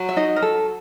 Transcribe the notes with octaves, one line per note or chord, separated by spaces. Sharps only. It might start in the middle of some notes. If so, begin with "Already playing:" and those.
Already playing: F#3
E5
D#4 D#5
A#4
A4